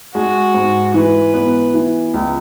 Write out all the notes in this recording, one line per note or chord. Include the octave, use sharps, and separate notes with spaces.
G#3 F#4
G#2
E3 B4
B3
E3
C#2